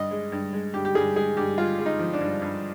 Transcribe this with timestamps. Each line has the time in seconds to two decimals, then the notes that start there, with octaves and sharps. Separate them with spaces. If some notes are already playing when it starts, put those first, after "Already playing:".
Already playing: G2 D#5
0.11 G#3
0.32 G2
0.53 G#3
0.74 G2 G4
0.85 G4
0.95 G2 G#4
1.16 G#3 G#4
1.37 G2 G4
1.58 G#3 F4
1.79 G#3
1.86 D#4
1.99 F3
2.13 D4
2.21 G2
2.42 G2